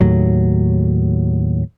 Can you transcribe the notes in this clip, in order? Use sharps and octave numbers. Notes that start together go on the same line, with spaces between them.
D#2 A2 F#3